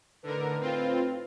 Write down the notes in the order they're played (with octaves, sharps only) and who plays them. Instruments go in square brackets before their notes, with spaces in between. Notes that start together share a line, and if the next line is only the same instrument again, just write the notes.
[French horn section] A2 D#4 B4 [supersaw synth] D3 A#4
[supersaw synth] C4 F4